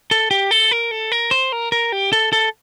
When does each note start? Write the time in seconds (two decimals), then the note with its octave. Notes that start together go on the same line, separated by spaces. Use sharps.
0.11 A4
0.31 G4
0.51 A4
0.71 A#4
0.91 A4
1.12 A#4
1.31 C5
1.52 A#4
1.72 A#4
1.92 G4
2.13 A4
2.33 A4